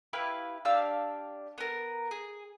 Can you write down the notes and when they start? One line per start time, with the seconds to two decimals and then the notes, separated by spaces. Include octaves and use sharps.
0.13 E4 G4 B4 F5
0.65 D4 G4 F5 E6
1.58 B3 A#4
2.11 G#4